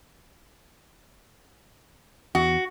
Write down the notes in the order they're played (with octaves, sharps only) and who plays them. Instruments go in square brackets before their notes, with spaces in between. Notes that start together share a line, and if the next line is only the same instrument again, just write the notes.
[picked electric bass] E2 [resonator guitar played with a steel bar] F#4